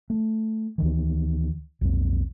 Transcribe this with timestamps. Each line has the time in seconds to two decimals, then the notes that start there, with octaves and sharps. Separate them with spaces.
0.10 A3
0.78 D2 D#3 E3
1.81 B1 F2